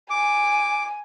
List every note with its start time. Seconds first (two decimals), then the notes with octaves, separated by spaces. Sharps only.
0.10 G#5 D6